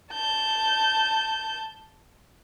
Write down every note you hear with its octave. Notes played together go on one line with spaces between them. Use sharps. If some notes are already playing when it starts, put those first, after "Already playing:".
A5 G6